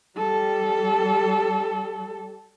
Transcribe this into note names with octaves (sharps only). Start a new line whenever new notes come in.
G3 A4